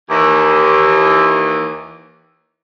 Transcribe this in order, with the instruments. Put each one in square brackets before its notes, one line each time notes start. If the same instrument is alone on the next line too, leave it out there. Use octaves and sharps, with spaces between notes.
[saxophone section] D#2 E3